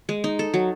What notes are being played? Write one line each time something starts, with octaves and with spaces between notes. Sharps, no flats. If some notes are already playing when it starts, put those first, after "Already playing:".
G#3
D#4
A4
F#3